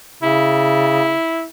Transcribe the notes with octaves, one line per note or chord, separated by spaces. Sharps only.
C#3 E4